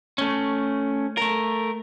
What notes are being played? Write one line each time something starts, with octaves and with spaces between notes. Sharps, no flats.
A3 C#4
A3 A#4